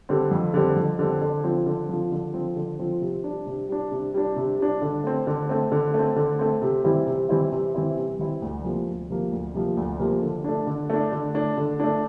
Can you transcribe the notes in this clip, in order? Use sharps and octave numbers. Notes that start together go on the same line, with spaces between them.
D3 G3 C4
F2
D3 G3 C4
F2
D3 G3 C4
D3
F3 C4 F4
D3
F3 C4 F4
D3
F3 C4 F4
D3
F3 C4 F4
C3
G3 D4
C3
G3 D4
C3
G3 D4
C3
G3 D4
D3
A3 C4
D3
A3 C4
D3
A3 C4
D3
A3 C4
C3
E3 G3 C4 E4
C3
E3 G3 C4 E4
C3
E3 G3 C4 E4
C3
E3 G3 C4 E4
D2
C3 F3 A#3
D2
C3 F3 A#3
D2
C3 F3 A#3
D2
C3 F3 A#3
D3
A3 D4
D3
A3 D4
D3
A3 D4
D3
A3 D4